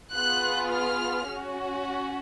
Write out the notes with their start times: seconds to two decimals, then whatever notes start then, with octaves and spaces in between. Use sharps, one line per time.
0.15 B3 F4 G#4 F#6
0.71 F6
1.28 C#4 F#4